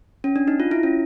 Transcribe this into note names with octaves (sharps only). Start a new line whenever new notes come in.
C#4
D4
D#4
F4
E4
C#4